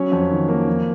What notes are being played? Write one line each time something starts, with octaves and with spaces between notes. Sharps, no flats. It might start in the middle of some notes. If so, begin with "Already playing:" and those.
Already playing: F#3 C#4 C#5
F2
D#3
A#3
F2